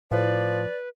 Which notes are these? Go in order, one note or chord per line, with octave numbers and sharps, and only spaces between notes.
A2 F3 B4 D5